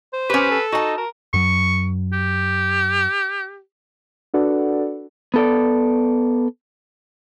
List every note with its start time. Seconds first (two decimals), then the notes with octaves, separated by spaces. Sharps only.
0.13 C5
0.30 C#4 G4 B4
0.50 A4
0.72 D#4 F#4 A5
0.98 A#4
1.34 F#2 F#3 C#6
2.13 G4
4.34 D4 F#4 A4 B4 D5 F#5
5.34 B3 A4 D5